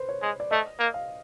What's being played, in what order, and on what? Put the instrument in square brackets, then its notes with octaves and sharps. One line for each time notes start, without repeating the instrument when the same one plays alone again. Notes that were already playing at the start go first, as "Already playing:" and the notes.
Already playing: [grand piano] B4 C5
C#5
[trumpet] G#3
[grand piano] D5
[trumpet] A3 [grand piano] D#5
[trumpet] A#3
[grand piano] F5